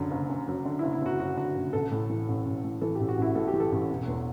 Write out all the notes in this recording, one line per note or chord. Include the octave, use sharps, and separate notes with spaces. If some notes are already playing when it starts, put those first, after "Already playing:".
Already playing: F#1 F#2 D3
F#1
F#1
F#2
D3
F#1 E4
E4
F#1 F#4
F#2 F#4
D3 F#4
F#1
A1 A4
A2
E3
A1
A1
A2
E3 A4
A1 G4
F#4
A1 E4
A2 A4
G4
E3
A4
A1
E1
E2